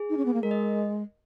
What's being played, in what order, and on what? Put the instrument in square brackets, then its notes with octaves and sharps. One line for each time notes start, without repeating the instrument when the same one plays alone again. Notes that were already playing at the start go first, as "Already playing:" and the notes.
Already playing: [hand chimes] G#4
[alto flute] D#4
C#4
B3
A#3
[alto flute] G#3 [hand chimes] A#4
[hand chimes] D#5